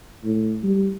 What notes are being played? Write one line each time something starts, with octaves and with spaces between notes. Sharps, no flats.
A2
G3